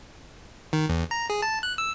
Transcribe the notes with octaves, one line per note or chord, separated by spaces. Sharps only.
D#3
E2
A#5
G#4
A5
F#6
E6